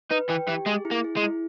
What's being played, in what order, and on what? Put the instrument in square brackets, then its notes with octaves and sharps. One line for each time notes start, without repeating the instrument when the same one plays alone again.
[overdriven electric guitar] D#4 [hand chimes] B4
[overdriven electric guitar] E3 [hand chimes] G5
[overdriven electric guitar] E3 [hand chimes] G4
[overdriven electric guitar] G#3 [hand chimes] G#4
[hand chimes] E4
[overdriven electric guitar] A#3
[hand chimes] G#4
[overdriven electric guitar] G#3
[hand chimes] E4